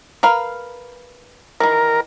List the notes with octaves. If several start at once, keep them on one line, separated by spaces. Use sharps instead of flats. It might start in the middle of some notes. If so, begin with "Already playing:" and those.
A#4 B4 F5
D#3 E3 A#4